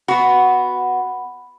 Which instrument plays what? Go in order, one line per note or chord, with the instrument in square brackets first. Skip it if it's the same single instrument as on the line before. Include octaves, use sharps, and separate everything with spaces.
[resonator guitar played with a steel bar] B3 F#4 [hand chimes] F#5 B5